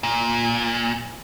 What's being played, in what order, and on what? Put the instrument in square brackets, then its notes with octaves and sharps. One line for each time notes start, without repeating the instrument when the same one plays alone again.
[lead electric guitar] A#2